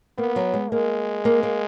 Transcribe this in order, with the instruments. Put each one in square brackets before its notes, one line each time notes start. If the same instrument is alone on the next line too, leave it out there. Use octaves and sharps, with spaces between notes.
[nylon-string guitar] A#3 [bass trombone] B3
[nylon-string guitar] F#3
G#3
[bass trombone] G#3 [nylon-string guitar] A#3
[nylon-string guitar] A#3
A#3